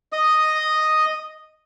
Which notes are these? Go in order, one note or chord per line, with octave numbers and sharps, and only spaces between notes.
D#5 D#6